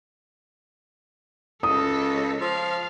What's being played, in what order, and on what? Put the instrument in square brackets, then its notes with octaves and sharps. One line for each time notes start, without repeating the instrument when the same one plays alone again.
[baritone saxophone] C#2 [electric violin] A4 [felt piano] D#6
[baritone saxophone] F3 [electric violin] F5